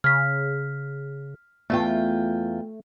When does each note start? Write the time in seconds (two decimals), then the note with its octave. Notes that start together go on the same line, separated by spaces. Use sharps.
0.04 C#3 F6 B6
1.70 E2 A3 F4 G5